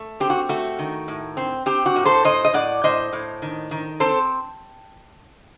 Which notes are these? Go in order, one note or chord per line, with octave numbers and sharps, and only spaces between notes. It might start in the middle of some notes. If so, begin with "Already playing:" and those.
Already playing: A3
C4 G4
F#4
A3 F#4
D#3
A2
C4
C4 G4
F#4
A2
A4 C5
A2 C5 D#5
D#5
A2 D5 F#5
A2 C5 D#5
A2
D#3
D#3
C4 A4 C5